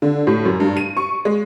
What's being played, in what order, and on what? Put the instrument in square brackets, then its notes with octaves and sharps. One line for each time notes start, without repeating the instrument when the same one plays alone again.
[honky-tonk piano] D3
A2
F#2
G2
D#7
C#6
G#3